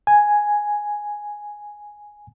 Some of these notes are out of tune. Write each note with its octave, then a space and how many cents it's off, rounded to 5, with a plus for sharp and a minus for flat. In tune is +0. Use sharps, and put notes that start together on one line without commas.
G#5 +0